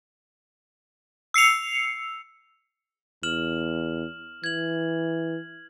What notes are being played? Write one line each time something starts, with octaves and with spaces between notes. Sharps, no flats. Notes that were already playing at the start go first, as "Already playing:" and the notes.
E6 C7 C#7 F7
E2 F6 E7 F#7
E3 G#6 F#7